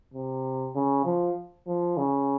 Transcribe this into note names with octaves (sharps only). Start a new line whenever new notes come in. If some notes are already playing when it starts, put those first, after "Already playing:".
C3
C#3
F3
F3
C#3